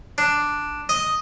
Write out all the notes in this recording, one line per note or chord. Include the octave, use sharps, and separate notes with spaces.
D4
D#5